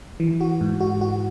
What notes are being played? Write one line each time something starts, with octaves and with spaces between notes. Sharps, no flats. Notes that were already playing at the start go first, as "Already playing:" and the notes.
E3
F#4
G#2
F#4
F#4